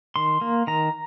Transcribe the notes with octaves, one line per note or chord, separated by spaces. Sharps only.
D#3 C6
A#3
D#3 A#5